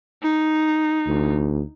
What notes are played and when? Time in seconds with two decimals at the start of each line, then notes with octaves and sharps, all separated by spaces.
0.23 D#4
1.07 D2